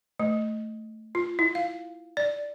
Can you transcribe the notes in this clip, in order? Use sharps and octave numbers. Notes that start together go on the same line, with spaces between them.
A3
F4
E4
F5
D5